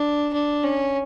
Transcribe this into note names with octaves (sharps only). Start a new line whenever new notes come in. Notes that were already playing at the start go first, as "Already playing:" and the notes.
Already playing: D4
D4
C#4